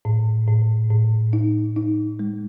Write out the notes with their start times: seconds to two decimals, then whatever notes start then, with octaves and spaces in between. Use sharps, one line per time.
0.05 A2
0.48 A2
0.90 A2
1.33 D#4
1.76 D#4
2.19 G#3